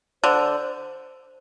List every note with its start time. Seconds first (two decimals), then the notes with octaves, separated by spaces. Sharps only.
0.24 D3 C5